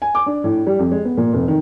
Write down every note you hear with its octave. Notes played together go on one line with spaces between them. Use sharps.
G#5
D6
D4
A2
G3
F2
G#3
B3
A#2
F1
D#3